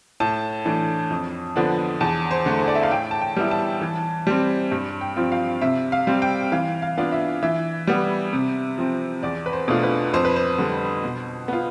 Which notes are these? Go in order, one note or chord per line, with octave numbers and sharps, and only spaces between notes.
A2 A5
E3 A3 D4
F2
D3 F3 B3 D4
E2 A5
C5
D3 A3
C5
D5
E5
F5
A2 G5
A5
G5
G3 B3 E4
A5
E3
G3 C4
G2
G5
F3 C4 F4
F5
C3 E5
F5
G3 C4
G5
E3 F5
F5
B3 D4 F4
E5
E3 E5
G3 B3
C3
F3 C4
E2 D5
B4
C5
B2 A3 D4 F4
B4
F2 C5
B4
C5
D3 G3
B2
B3 F4